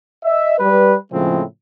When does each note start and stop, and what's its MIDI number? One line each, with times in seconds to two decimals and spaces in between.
0.23 0.53 75
0.23 0.53 76
0.58 0.95 55
0.58 0.95 71
1.11 1.42 45
1.11 1.42 49
1.11 1.42 53
1.11 1.42 56
1.11 1.42 60